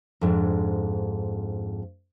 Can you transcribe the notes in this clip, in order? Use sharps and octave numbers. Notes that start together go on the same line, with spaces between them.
F2 G#2 D4